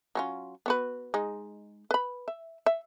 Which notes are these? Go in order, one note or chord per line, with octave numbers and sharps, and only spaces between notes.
F#3 C#4 F4
B3 F#4 B4
G#3 D#4
B4 B5
E5
E5